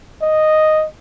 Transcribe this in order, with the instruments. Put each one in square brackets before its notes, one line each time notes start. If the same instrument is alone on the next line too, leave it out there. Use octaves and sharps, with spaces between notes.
[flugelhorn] D#5